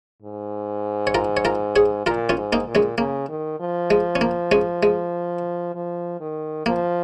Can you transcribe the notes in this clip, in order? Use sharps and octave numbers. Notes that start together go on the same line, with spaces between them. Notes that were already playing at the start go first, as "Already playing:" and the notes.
G#2
C#5
F4 A#4
C#5
F4 A#4
G#4 C#5
A#2 F4 A#4
C#4 F4
G#2
A#3 D#4
A#2
G#3 C#4
C#3 A#3
D#3
F3
G#3
C#4
A#3
G#3 C#4
G#3
F3
D#3
F3 A#3